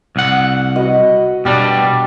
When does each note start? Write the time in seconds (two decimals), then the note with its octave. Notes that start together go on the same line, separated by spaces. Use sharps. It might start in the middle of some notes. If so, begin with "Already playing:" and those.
0.16 C2 F#5
0.76 F#4 B4 D#5
1.45 B2 G3 D4 G4